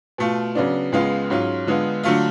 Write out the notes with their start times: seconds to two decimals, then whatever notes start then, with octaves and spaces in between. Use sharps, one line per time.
0.18 B2 A3 F4
0.55 C#3 F#3 B3 D4
0.92 C#2 C#3 G#3 B3 F4
1.30 G#2 F#3 C#4 F4
1.67 D3 G#3 B3 F4
2.03 D3 F#3 A3 F4